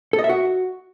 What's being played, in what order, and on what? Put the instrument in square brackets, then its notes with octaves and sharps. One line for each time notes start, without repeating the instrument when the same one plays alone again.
[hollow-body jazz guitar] A4
D#5
E5
F#4